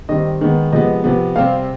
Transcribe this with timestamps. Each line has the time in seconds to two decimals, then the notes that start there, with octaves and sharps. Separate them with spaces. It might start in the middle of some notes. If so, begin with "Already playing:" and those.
0.09 D#3 G3 C4 D#5
0.41 D#3 G#3 B3
0.72 C3 F3 G#3 B3 D#5
1.04 C3 F3 B3
1.36 C3 G3 C4 F5